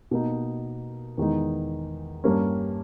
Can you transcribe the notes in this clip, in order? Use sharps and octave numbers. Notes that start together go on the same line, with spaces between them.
B2 A#3 D#4
E2 D#3 G#3 D#4
G2 G3 A#3 C#4